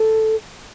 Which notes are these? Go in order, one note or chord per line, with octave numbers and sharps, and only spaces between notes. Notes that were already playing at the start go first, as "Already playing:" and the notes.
Already playing: A4